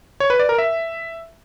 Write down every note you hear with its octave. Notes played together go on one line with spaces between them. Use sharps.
C#5
B4
D5
A#4
E5